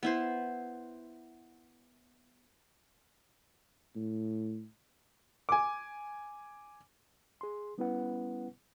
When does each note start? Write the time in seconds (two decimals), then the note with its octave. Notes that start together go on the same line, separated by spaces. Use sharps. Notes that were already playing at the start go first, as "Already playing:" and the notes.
0.03 B3 E4 C5
3.95 A2
5.49 G#5 D6
7.41 G#4 C6
7.78 G3 B3 C#4 E4 B4 F#5